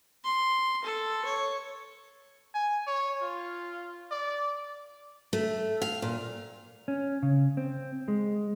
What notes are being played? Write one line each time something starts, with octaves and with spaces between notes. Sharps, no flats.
C6
A4
C#5
G#5
C#5
F4
D5
A3
F5
A#2
C#4
C#3
C4
G#3